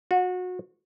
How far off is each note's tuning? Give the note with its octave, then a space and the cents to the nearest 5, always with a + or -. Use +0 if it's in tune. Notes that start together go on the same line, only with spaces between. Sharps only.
F#4 -30